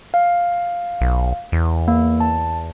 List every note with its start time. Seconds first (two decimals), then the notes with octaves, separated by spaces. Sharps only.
0.14 F5
1.01 B1
1.52 E2
1.88 A#3
2.20 A5